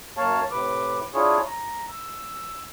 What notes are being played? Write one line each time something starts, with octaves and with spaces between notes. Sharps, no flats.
F#2 A#3 C#5 F5 A5
A2 C3 B4 D6
D4 E4 F4 G#4 C#5
A#5
E6